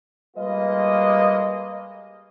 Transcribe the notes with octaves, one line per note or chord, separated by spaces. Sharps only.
G3 G#3 A#3 F4 B4 D#5